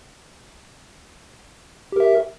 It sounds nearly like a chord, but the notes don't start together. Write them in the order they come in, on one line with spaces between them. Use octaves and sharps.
G4 A#4 E5